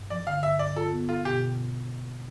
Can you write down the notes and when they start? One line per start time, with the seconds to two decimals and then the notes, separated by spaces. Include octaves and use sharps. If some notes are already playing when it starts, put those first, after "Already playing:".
Already playing: G2
0.10 F3 D5
0.27 D3 F5
0.43 G2 E5
0.59 G2 D5
0.76 F4 A4
0.92 B3
1.08 F4 A4
1.25 B2 G4